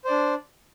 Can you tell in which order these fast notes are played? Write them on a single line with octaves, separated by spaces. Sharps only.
C5 D5 D4